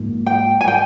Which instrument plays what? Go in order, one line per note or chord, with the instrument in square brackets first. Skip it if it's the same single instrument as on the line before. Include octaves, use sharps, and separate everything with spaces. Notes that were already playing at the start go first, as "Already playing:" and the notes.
Already playing: [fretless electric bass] G#2 F3 A#3
[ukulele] G5
G#5
G5